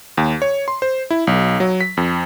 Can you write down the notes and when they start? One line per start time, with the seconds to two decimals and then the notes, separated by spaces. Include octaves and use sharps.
0.17 D#2
0.42 C#5
0.68 C6
0.82 C5
1.10 E4
1.27 B1
1.60 F#3
1.81 B6
1.97 F2